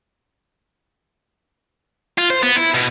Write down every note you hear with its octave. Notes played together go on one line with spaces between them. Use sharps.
F4
C5
B3
E4
B2